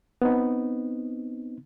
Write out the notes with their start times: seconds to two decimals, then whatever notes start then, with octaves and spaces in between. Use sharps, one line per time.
0.22 B3 C4 D#4